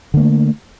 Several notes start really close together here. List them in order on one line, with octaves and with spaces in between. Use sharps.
D3 A#3 A3